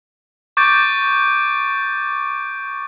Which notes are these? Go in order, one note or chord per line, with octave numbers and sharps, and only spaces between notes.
C#6 D6 G6 A6 D7